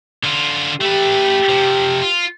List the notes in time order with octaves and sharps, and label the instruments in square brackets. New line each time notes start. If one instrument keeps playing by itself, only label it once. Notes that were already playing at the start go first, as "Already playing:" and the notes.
[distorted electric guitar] D3 F4
[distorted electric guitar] A3 B4 [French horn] G4
[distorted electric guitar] C3 F3
F4